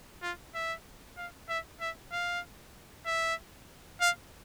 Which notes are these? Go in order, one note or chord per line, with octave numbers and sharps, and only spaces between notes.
F4
E5
F5
E5
E5
F5
E5
F5